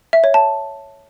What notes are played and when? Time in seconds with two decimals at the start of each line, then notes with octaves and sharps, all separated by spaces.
0.13 E5
0.24 C#5
0.34 A5